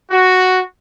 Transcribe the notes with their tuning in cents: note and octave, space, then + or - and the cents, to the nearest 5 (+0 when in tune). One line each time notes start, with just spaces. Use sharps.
F#4 +0